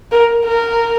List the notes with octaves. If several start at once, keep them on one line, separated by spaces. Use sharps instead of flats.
A#4
A#4